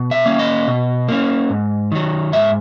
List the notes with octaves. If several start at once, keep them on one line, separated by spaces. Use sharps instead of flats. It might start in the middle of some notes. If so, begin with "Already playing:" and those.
Already playing: B2
E5
A#3 C#4
D#5
B2
A#3 C#4
G#2
D#3 F#3
G#2 E5